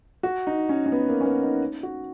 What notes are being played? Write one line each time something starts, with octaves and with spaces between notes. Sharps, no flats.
F#4
D#4
C#4
C#4
B3
A#3
C#4
B3
D#4
F#4